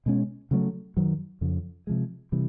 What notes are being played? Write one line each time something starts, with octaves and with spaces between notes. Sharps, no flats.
B2 G#3 C#4
C#3 F#3 A3
F#2 D#3 F#3
F2 C#3 F3
C3 F3 G#3
C3 E3 G3